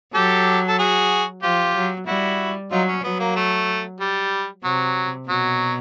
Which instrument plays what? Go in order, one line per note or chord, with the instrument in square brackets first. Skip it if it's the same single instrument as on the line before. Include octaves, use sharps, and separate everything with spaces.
[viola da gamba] F#3 [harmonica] G4 A4
[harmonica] A4
F#4 G#4
[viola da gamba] F3 [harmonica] F4 G4
[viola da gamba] F#3
[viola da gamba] G3 [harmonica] E4 F#4
[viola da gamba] F#3 [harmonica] D#4 F4
[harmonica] C#4
[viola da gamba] F#3 [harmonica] B3
[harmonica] A#3
A3
G3
[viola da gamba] C3 [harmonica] F#3
[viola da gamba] B2 [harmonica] F#3